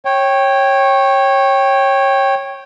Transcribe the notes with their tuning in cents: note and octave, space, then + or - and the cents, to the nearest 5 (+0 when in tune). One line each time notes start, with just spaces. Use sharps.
C#5 -15 G5 +0